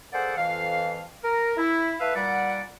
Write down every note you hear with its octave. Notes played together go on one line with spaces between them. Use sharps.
A#3 G#4 A4 C5 D5 F#5
F2 E3 F5
A#4
E4
A3 B4 E5 F5
A#2 G3 D5 F#5